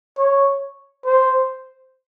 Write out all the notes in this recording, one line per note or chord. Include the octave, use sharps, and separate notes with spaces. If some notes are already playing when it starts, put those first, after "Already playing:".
C#5
C5